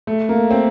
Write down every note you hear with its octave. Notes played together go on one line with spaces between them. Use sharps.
A3
A#3
C4